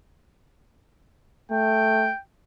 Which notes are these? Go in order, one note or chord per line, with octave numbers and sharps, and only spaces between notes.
A3 G5